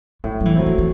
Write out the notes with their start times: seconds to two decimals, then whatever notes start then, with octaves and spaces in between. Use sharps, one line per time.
0.24 A2 E3
0.40 F#3
0.45 E3
0.56 F#3 A3 C4
0.66 E3
0.78 E3